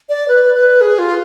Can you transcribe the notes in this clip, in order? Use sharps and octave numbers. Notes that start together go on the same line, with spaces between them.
D5
B4
B4
G#4
F4